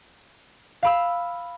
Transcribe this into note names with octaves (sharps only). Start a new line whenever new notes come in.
F5 B5 E6